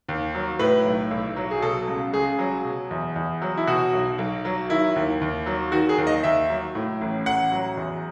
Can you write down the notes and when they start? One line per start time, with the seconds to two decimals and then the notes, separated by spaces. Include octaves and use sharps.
0.09 D#2
0.35 F#3
0.59 A2 B4
0.85 B1
1.11 B1
1.36 F#3
1.51 G#4
1.62 B2 A4
1.88 C#2
2.13 C#2 G#4
2.39 F#3
2.64 B2
2.91 E2
3.16 E2
3.42 F#3
3.57 E4
3.67 B2 F#4
3.93 B1
4.18 B1
4.45 F#3
4.69 D#3 E4
4.96 D#2
5.21 D#2
5.46 F#3
5.72 D#3 F#4
5.89 G#4
5.98 D#2
6.07 D#5
6.23 D#2 E5
6.50 F#3
6.75 A2
7.01 A1
7.26 A1 F#5
7.52 F#3
7.77 E2